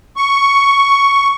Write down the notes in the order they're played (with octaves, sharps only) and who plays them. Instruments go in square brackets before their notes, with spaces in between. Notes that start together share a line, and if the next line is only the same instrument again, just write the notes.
[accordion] C#6